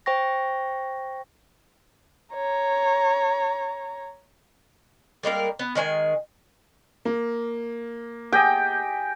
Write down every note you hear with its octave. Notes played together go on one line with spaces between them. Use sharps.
C5 G5 C#6 A#6
C#5 A#5
G3 G#3 A#3 A#4
B3
D#3 G#3 C#5 G#5
A#3
G4 G#4 D#5 G5